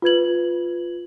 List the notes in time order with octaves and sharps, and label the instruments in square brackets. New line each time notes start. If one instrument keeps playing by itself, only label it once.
[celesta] F4 B4 G#6 F#7